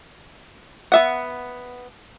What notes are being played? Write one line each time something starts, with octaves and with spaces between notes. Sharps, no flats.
B3 E5 F#5